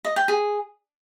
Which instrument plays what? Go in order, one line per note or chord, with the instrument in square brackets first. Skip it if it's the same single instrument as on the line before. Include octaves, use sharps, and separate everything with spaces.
[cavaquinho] D#5
G5
G#4